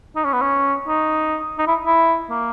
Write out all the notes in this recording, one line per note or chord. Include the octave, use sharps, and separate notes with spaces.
D#4
C#4
B3
C#4
D#4
D#4
E4
E4
A#3